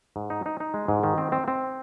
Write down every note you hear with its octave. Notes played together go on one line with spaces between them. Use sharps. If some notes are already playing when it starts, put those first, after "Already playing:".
G#2
D#4
D#4
D#4
G#3
G#2
D#3
C4
C4
C4